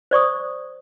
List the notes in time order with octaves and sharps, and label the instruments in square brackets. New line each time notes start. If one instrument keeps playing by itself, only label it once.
[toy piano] C5 D5 C#6 D#6